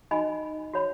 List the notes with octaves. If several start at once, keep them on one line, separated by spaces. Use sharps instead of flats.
D#4 F#4 D#5 G#5 B5
F#4 C#5 B5